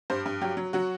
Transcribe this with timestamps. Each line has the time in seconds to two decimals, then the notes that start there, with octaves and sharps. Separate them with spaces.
0.10 G2 C5
0.26 G2
0.41 F#3 G4
0.57 F#3
0.73 F#3 F#4